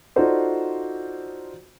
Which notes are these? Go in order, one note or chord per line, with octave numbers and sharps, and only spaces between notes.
D#4 F4 F#4 A4 C5 D5